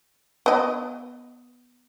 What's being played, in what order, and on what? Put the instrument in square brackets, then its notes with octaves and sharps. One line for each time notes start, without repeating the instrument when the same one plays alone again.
[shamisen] B3 D#5